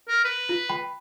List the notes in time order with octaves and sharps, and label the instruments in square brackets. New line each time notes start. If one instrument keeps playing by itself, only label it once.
[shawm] A#4
B4
[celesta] F4
G5 B5